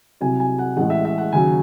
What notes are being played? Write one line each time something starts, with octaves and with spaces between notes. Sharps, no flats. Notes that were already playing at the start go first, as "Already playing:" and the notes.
C2 C3 F#3 G#5
G#5
F#5
A1 A2 G#3 F#5
E5
E5
F#5
D#2 C#3 F#3 G#5